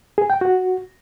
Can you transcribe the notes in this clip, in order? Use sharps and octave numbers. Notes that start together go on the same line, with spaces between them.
G#4
G5
F#4